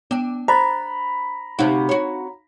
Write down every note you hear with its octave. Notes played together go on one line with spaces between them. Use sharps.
B3 D4 G5
C5 A#5 B5 F#6 A6
D2 C3 D#4 F#4 F5
F#4 C#5